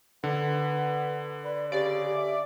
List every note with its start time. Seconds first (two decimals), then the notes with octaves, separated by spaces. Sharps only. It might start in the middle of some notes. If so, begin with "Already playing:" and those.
0.24 D3 B3
1.44 B4 D5
1.72 C#3 G4 D5
2.15 E5